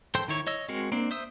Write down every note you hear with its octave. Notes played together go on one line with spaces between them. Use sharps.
A4 C5 G5 C6 G6
D#3 E4 C#5
C#5 D#5 E6
G#3 C4 F#4 A#4
A#3 C4 D4
C5 E5 D#6 E6